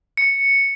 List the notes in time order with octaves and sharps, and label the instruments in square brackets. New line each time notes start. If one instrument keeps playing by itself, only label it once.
[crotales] C#7